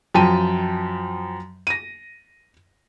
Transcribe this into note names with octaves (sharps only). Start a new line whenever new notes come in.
F#2 F3 G5 A5 D#7
A#6 D#7